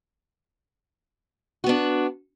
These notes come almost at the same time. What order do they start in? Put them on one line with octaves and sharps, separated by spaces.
F#4 B3 D4